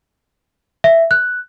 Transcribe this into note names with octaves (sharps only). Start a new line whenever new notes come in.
E5
F#6